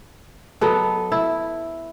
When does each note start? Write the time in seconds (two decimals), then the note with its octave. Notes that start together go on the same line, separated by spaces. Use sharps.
0.61 F#3 B3 A4 D#5
1.12 E4